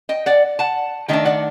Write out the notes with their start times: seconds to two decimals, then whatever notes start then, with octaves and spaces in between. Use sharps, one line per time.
0.09 D#5 G5
0.26 D5 F#5
0.59 F#5 A5
1.08 D#3 A3 D4 D#5 G5
1.25 D5 F#5